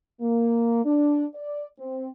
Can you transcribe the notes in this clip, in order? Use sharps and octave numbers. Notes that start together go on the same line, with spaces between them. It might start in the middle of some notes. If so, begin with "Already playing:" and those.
A#3
D4
D5
C4